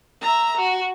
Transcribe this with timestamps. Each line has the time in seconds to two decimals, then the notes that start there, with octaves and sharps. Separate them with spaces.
0.22 E5 A#5
0.57 F#4